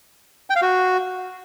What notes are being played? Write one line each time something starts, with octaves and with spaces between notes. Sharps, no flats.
G5
F5
F#4